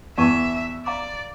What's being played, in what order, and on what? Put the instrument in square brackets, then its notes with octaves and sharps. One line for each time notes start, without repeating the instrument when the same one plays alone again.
[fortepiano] E2 [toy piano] D5 A5 C#6 [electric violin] E5
[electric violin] D5 [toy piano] F5 A#5 D6